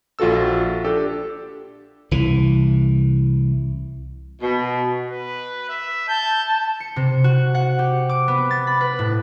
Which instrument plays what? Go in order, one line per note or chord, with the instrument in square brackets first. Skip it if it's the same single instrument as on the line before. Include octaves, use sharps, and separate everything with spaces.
[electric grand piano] A#1 F4 F#4 A4 E6
D4 G4 A4
[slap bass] C2 E3
[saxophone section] B2
[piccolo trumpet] B4
E5
[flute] A5 [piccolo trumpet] G6
[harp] C#7
C3
F#4
F#5
G4
D6
B3
A6
B5
B4
A2